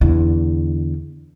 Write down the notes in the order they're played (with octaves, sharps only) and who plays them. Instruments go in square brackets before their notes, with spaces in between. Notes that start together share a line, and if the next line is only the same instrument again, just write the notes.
[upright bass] E2 D3